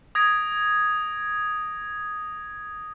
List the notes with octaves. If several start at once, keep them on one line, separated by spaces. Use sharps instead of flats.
D#6 G#6 A#6 D7